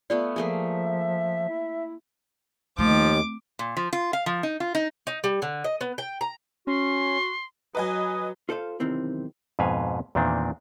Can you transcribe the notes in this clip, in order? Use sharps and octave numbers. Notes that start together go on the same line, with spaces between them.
A3 B3 F4 D5
F3 A3 A#3 G#4 E5
E4
D#2 F3 A3 C4 D6
A#2
F3
F4
F5
F3
D#4
F4
D#4
D#4
G3
D3
D#5
B3
G5
A#5
C#4 F#4 C6
F#3 B4 D#5 G#5 D#6
F4 A4 C5 D5 F5
B1 E2 C3 D#3 C4 E4
F2 G#2 B2 B4 F5 G#5
E2 A#2 D#3 C4 D4